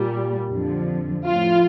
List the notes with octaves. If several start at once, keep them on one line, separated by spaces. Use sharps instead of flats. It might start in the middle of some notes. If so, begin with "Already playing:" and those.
Already playing: A#2 G3
F2 D3 F3
A2 F3 F4